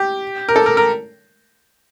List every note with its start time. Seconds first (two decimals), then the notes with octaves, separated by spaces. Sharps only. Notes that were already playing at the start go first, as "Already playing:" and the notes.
Already playing: G4
0.49 A#4
0.56 A4
0.66 A#4
0.77 A#4